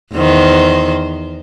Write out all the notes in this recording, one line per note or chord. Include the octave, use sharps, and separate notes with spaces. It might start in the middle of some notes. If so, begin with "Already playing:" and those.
E2 D#3 C5